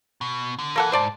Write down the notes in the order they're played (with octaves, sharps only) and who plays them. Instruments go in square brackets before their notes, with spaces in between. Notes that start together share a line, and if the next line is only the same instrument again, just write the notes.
[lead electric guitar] B2
D3
[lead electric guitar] B1 E3 [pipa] A#3 A4 F#5
[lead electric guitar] G#2 [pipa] C5 D5 A5